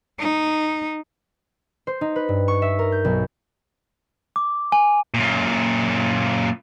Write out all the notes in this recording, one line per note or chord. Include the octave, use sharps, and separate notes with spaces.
D#4
C5
D#4
B4
G2
C#6
E5
A#4
G6
B1
D6
G#5
F#2 A#2